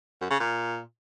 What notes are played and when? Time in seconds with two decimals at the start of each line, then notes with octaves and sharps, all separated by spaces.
0.21 F#2
0.31 C#3
0.40 A#2